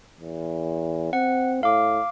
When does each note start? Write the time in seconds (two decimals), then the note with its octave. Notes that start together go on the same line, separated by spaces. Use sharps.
0.20 E2
1.13 C4 F#5
1.63 A2 F5 D6